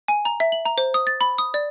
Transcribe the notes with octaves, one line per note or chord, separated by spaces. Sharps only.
G#5
A#5
E5
F#7
A#5
C5
D#6
A6
B5
D#6
D5